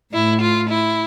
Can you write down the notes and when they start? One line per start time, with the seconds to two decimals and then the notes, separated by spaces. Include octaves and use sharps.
0.13 A2 E4
0.41 F4
0.69 E4